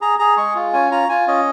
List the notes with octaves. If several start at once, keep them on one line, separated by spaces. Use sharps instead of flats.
G#4 A#5
G#4 A#5
G#3 C#6
F4
C#4 G#5
F4 A#5
F4 G#5
C#4 D#5